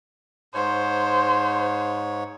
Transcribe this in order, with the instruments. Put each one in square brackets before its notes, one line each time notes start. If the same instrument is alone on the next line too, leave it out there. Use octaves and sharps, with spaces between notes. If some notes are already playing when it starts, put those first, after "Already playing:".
[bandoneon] G#2 C#5 [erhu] C5